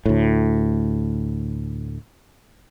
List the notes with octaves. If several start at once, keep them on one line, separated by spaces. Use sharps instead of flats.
D2 A2